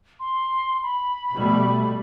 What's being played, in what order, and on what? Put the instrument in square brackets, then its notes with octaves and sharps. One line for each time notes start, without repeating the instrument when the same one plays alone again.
[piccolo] C6
B5
[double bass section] B2 G3 A3